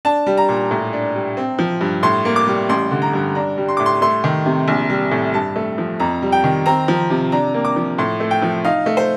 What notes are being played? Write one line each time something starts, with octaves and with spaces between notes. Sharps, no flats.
D4 A5
G3
A#5
A#2
A2
D4
G3
C4
F3
G2
A2 C6
A#3
D6
G3
A1 C6
D3
A#5
G2
D4 A#5
G3
C6
A2 D6
C6
A3 C6
D#3
C3
A#1
G3
A2
G2 A5
A3
F3
F2 A#5
G3
G5
D#3
C4 A#5
F3
C3
D4 A#5
A#3
D6
F3
A2 C6
A3
G5
F3
D#4 F5
A3
C5